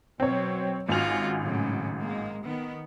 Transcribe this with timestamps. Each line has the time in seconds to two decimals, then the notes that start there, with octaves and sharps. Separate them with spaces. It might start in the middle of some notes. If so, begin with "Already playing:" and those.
0.20 B2 F#3 C4 C#5
0.89 G#1 C#4 F4 F#4 G#5 F7
1.42 A2 C#3 F#3
2.01 G#3 A#3
2.43 D#3 B3